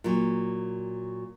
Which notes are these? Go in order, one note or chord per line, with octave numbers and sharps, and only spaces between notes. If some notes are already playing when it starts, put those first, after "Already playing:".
A#2 F#3